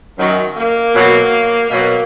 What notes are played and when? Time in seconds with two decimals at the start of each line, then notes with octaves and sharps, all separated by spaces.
0.18 F#2 D#3 F#3
0.56 A#3
0.94 B2 F#3
1.70 B2 F#3 A#3